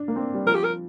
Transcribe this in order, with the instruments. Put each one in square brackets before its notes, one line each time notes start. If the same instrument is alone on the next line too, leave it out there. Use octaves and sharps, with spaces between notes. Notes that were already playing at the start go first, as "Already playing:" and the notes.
Already playing: [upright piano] D4
A#3
C4
G3
[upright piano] F3 [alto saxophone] A#4
[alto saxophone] G4
A#4